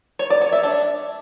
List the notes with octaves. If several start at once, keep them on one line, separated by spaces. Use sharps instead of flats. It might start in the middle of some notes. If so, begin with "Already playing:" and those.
C#5
D5
C#5
E5
D4